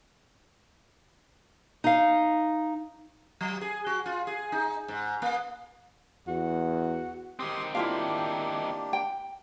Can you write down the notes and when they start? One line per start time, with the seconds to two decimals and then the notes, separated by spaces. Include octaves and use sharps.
1.84 D#4 F5
3.41 F#3
3.61 G#4
3.86 F#4
4.06 F4
4.27 G#4
4.52 D#4
4.88 G#2
5.22 A#3
6.27 E2 F#4
7.39 D#3 C4 G4 C6 D#6
7.75 A#3 D4 E4 F4 G4 F5
8.93 G5